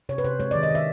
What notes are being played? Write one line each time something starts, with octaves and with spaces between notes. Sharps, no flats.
C3 C#5
B4
C3 C5
G#3 C#5
D5
D#3
D#5
D#3 E5